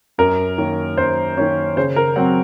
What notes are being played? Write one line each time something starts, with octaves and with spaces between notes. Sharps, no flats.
F#2 A#4
D#3 A#3 C#4
F#2 C5
D#3 A#3 C#4
C#3 C5
A#4
F#3 C4 F#5